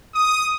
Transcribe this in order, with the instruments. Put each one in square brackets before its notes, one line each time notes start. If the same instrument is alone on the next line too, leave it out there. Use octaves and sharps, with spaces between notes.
[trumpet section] D#6